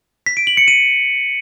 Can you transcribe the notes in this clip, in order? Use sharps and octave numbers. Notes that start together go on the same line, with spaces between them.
B6
D7
F#7
C#7
D#7